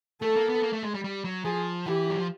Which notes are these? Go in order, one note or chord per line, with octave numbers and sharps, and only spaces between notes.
A3 A4
A#3
B3
A#3
A3
G#3
G3
G3
F#3
F3 G#4
E3 G4
F#3
F3